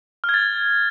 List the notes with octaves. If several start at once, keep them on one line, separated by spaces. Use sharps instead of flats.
F6
G#6
A6